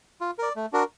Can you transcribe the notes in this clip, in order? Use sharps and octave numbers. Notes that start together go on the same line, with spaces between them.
F4
A#4 D5
A3
D4 F#4 A#4